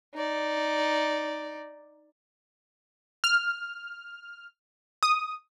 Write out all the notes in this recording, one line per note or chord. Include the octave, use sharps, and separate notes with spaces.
D#4 D5
F6
D#6